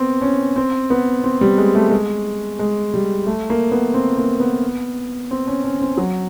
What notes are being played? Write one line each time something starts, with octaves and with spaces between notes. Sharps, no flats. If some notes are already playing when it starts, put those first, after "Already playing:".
Already playing: B3 C4
C#4
C4
B3
C4
G3
G#3
A3
G#3
G#3
G3
A3
A#3
B3
C4
A#3
B3
C4
C#4
C#4
C4
F#3